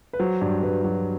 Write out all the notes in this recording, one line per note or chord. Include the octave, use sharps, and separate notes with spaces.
B4
F#3 C5
G2
G2 B4
F#3